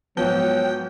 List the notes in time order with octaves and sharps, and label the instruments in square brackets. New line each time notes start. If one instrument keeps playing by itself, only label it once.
[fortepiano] G#2 F3 [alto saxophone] F#3 [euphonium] B3 [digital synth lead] G5